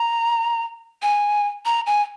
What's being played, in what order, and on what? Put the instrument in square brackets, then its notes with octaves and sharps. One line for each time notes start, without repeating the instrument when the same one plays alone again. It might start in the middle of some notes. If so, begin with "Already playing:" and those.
Already playing: [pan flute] A#5
G#5
A#5
G#5